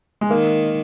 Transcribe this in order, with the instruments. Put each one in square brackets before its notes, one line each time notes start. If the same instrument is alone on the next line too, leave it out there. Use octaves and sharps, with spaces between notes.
[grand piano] G#3
[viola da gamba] D#3 [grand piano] A#3